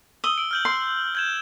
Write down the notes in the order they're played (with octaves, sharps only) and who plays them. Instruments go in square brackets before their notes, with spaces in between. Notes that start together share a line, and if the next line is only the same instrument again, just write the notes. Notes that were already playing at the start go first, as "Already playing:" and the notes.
[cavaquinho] D#6 [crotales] E6 G7
[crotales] E6 D7
F6 G6 F#7
[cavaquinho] C6
[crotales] G6 G#6 E7